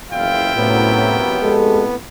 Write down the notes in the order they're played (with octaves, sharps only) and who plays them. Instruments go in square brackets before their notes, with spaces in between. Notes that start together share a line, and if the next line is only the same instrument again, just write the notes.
[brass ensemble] F#1 E2 F5 [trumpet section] E4 F4 G5
[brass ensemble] F#2 C3 F#3 [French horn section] A2 [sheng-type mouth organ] B3
[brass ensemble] F2 A2 [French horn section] G#3 G4 A4